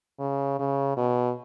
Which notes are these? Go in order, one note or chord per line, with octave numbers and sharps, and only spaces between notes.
C#3
C#3
B2